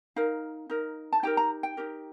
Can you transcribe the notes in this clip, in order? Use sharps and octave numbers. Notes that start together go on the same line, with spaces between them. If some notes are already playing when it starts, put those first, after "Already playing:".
D#4 A#4 F5
D#4 A#4
A5
D#4 G4 A#4 G5
A#5
G5
D#4 G4 A#4